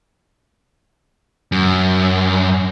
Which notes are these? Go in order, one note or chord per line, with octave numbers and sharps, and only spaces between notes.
F#2